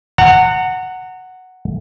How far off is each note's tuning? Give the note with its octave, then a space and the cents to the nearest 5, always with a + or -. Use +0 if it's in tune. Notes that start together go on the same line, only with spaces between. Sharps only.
F#5 +0 A#5 -35